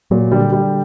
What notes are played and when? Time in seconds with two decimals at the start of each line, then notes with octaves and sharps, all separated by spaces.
0.11 A#2 F#3
0.32 D3 G3
0.53 G3